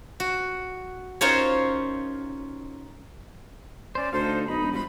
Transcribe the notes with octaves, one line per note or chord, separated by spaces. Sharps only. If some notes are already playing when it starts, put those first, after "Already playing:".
F#4
C#4 D#4 F4 A#4 C5 C#5
C#4 C5 D5
D2 D#4 A4 C5 F5
B1 D#4 B5
E1
G3 F4 C5 B5